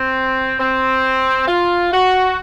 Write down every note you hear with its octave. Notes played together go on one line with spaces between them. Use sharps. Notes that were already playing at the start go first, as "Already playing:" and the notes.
Already playing: C4
C4
F4
F#4